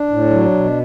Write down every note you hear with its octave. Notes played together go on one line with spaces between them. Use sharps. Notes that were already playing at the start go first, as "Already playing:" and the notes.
Already playing: D4
A2
F#3
B2